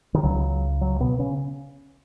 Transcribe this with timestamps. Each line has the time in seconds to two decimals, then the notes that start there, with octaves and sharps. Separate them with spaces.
0.14 D#3
0.23 C#2 C#3 F#3
0.81 F#3
1.00 B2 B3
1.19 C#3 C#4